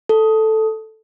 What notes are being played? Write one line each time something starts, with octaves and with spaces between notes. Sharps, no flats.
A4